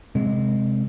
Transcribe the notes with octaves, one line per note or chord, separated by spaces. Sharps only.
C3 G#3